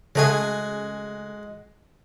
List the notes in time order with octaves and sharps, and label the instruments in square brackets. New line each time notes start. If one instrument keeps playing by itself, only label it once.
[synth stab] C#3 A3 G#4 [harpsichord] G#3 F#4 G#5